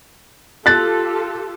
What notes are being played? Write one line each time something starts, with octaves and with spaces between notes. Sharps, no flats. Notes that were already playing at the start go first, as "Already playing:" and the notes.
F4 G4 A4 F#6 A6